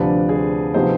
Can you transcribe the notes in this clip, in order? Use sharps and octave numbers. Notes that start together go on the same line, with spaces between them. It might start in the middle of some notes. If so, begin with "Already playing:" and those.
Already playing: D2 C3 F3 B4 D5
G#4 C5
C3 F3 B3 D#4 G#4 C5